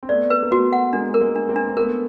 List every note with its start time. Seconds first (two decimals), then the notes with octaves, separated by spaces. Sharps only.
0.03 C4
0.09 A3 B3 D5
0.30 B4
0.43 A#3
0.51 A3 B3 F#4
0.73 F#5
0.93 G#3 A#3 D4
1.14 A#4
1.21 G#3 A#3
1.35 D4
1.49 A#3 C4
1.56 D4
1.69 C4
1.77 A3 B3 A#4